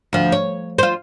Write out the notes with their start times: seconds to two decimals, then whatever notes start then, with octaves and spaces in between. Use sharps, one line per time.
0.13 D2 F3
0.32 C#5
0.78 F4 C5